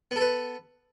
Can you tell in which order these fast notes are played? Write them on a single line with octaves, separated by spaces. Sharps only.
B3 A4 B4